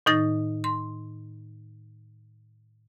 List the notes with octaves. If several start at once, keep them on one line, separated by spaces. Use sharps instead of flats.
A2 D#3 D#4 A6 A#6
C6